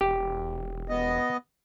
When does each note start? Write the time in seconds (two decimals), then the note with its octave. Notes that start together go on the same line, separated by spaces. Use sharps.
0.01 E1 G4
0.89 B3 D#5